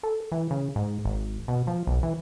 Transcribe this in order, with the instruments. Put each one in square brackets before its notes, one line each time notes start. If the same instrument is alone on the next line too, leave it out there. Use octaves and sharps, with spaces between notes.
[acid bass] A4
E3
C#3
G#2
G#1
B2
F3
B1
E3